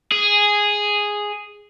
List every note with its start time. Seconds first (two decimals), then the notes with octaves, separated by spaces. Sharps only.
0.12 G#4